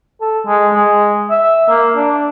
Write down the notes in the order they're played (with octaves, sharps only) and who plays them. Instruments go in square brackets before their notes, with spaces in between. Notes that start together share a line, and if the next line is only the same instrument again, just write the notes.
[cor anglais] A4
G#3
G#3
E5
A#3
D4